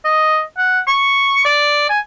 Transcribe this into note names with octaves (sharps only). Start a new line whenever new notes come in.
D#5
F#5
C#6
D5
G#5